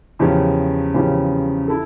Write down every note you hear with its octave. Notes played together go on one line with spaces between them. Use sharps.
E2 C#3 F3 C#4 G4
E2 C#3 F3 C#4 G4
E4 A4